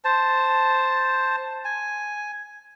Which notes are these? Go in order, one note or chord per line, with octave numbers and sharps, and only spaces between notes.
C5 A5
G#5